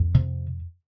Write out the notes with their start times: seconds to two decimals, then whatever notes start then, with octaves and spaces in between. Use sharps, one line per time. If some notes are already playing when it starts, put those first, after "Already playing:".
Already playing: F2
0.15 C3